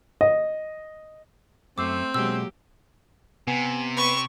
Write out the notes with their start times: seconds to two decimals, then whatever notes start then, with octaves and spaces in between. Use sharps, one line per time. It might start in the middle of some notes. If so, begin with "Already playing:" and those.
0.21 D#5
1.78 F#2 A3 C4 D6 E6 C7
2.14 B2 F#3 G#3 A#3 G4 E6
3.48 C3 B3 G#5
3.97 B4 C#6